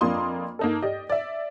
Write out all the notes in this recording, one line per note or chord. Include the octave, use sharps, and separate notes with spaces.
F2 A#3 D4 F4 C6 D#6
A#3 D#4 A4
G4 D5 D#5
D5 E5